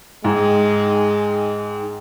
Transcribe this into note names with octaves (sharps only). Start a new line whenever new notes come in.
G#2 G#3 D#4 G#4 G5